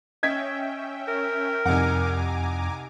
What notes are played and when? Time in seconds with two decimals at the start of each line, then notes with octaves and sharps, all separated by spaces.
0.23 C#4 D#5 E5 G5 G#6 B6
1.08 A#4
1.65 C2 F2 D#4 F#5 G#5 A#5 D6